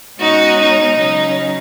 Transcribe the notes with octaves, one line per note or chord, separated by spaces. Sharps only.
B2 G#3 C#4 D#4 F#4
D#4
C#3 F#3 C#4 D#4